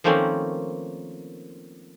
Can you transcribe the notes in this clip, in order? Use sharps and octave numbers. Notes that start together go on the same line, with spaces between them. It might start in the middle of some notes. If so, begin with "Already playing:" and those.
D#3 F3 A3 A#3 C4 C#4